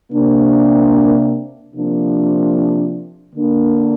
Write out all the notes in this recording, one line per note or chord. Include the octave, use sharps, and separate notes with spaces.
C3 A#3 D4
C3 F3 A#3 D4
D3 A#3 D4